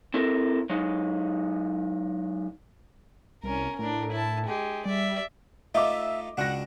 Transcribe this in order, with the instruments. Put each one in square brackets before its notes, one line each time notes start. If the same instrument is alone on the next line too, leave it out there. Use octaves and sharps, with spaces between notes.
[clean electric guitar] C4 E4 A4 A#4
F#3 G#3 D#4
[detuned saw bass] C2 [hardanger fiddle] C#4 A#4
[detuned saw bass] A2 [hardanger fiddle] D4 A#4
[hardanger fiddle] E4 A5
G#3 G4
[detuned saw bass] G3 [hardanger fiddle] D5 E5
[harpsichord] A3 D#4 F4 [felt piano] D#5 D6 [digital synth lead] E5
[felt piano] C#2 A#6 [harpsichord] D4 F#4 [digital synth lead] F#5